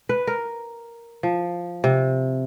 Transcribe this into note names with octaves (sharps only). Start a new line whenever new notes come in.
B4
A#4
F3
C3